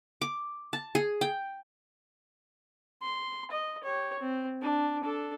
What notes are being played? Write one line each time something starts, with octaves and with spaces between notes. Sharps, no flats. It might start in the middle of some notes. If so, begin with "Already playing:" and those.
D6
A5
G#4
G5
C6
D#5
G4 C#5
C4
D4
D4 A4